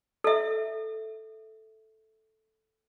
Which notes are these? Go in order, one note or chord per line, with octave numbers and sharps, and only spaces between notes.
A4 E5